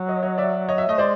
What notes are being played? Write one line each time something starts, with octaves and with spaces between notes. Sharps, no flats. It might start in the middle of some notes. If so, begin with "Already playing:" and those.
Already playing: F#3
C#5 D#5
C#5 D#5
D5 E5
C#5 D#5
E5
A3 D#5
G#3 C5 D5